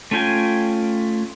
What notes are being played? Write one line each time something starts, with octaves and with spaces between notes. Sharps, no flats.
A3 C#4 F4 G5 G#5